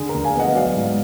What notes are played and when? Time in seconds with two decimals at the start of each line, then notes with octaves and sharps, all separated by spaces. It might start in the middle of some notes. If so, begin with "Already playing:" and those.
Already playing: D3 G#4
0.09 D2 A#4
0.25 F5 G#5
0.35 B3 D#5 F#5
0.55 F#3 D5 F5
0.76 G#2